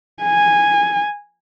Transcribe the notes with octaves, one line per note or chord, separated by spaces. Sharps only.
G#5